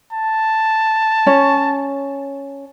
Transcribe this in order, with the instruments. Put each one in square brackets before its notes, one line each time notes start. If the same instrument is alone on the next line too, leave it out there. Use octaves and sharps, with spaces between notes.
[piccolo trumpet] A5
[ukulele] C#4 C#5